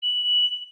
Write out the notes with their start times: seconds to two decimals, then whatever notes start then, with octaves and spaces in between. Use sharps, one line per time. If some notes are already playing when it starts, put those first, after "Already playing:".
0.02 F#7